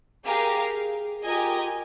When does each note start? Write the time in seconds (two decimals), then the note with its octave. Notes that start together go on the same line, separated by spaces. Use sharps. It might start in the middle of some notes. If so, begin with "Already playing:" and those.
0.24 G4 G#4 A#4 F5 G#5
1.24 F4 G4 A#4 D#5 G#5